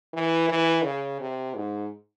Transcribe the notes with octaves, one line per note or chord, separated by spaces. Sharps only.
E3
E3
C#3
C3
G#2